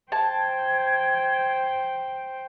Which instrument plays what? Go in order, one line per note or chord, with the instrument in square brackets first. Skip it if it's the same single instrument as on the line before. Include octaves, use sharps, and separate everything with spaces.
[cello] C5 G5 [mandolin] A5 [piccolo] G#6